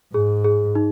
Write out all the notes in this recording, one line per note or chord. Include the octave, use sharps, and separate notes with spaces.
G#2 G#4
G#4
D#4